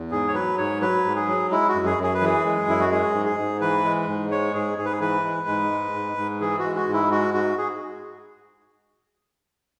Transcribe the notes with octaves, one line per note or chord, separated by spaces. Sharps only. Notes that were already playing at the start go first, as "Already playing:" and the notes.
Already playing: E2
G#2 G#4
C#5
F#3 B4
G#2 C#5
F#3 B4
G#2
G#4
F#3
G#3 E4
F#4
F#2
G#4
F#2
G#4
B4
E3 G#4
G#3
F#2 E4
F#4
G#3 G#4
G#2
G#4
G#2
E3 B4
G#3
G#2
G#3 C#5
G#2 G#4
G#2 G#4
B4
G#4
E3 B4
G#3
G#2
G#3
G#2
G#2
E3 G#4
G#3 F#4
F#4
G#2
E4
G#3 F#4
G#2 F#4
G#4